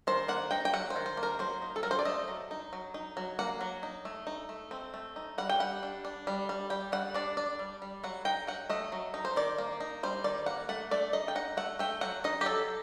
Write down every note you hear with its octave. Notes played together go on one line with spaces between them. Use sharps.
D#3 C5
A#3 F#5
D#4 G5
G5
F#3 F#5
C5
D#3
C5
A#3
A#4
F#3 C5
D#4
A4
F#3 A#4
C5
D5
A3 D#5
F#3
D#4
F#3
D#4
F#3
A#3 F#5
F#3
D#4
A3
D#4
A3
C4
A3
D#4
G3 F#5
G5
G3 F#5
D4
D4
G3
G3
G3 G5
G3 F#5
D4 D5
D4 D5
G3
G3
F#3 F#5
D#4 G5
F#3 F#5
A3 D#5
F#3
D#4
C5
D#3 D5
A#3
D#4
G3 C5
D#3 D5
A#3 F#5
A3 F#5
A3 D5
D#4 D#5
G5
D#4 F#5
A3 F#5
A3 G5
F#3 F#5
D#4 D#5
G4
F#3 A4